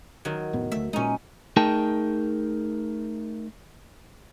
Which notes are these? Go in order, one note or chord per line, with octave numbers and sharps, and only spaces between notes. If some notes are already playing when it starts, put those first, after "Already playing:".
D#3 F#3
F1 A2 B3
D2 A3 E5
A#2 G#3 C#4 D#4
A3 D#4 G#4 A#4 G5 A5